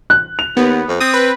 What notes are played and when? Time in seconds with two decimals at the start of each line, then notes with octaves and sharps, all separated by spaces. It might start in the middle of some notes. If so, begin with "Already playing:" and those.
0.10 F#6
0.39 F7
0.57 D#2 B3
0.88 F2
1.00 C4 D#6
1.14 B4